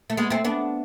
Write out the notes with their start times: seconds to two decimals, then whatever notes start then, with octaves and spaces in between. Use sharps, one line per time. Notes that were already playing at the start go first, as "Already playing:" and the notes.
0.10 A3
0.17 G#3 B3
0.30 A3 C4
0.45 B3 D4